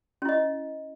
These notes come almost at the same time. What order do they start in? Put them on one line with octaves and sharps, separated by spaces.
C#4 E4 D#5